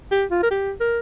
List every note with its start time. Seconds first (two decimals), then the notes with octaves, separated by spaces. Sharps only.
0.11 G4
0.31 F4
0.43 A#4
0.51 G4
0.80 A#4